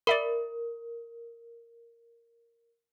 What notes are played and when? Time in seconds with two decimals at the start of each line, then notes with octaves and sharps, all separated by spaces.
0.07 A#4 D5 E5 B5